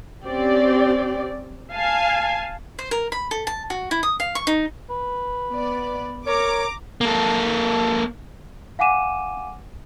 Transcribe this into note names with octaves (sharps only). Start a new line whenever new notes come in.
C4 C#4 G4 D5
F5 G#5 A5
C5
A#4
B5
A4
A5
F#4
E4
D#6
F5
C#6
D#4
B4
B3 D5
A#4 C#5 A#5 D6
A#3 A4
F5 F#5 G#5 D6 D#7 E7